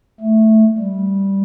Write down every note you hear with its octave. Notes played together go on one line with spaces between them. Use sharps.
A3
G3